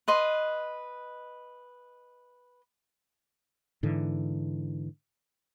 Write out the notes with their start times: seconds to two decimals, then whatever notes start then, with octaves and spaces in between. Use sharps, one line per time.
0.08 B4 D#5 C6
3.83 G#2 D3 E3